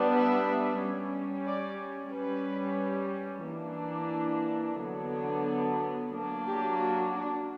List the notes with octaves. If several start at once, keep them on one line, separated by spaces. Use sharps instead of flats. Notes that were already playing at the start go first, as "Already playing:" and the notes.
Already playing: G3 B3 D4
E5
G3 C#4
D5
G3 C#4 B4
E3 A#3 D4
D3 F#3 B3 D4
F#3 A#3 D4
G4
F#4
D4